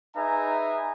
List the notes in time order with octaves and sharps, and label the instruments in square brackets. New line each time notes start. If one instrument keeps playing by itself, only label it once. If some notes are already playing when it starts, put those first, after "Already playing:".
[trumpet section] D#4 G#4 B4 E5 G#5 A#5